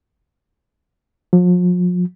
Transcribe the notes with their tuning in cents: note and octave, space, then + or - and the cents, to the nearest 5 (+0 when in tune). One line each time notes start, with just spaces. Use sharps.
F3 +40